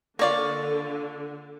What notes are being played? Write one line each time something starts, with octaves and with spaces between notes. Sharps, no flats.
D3 A#3 F4 C#5 D5 C#6